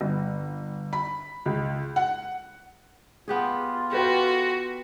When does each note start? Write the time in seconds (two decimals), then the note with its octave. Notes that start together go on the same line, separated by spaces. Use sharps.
0.01 G1
0.93 B5
1.46 C#2
1.96 F#5
3.28 B3 F4 G4 G#4
3.92 F#4 G4 A4 B4 G5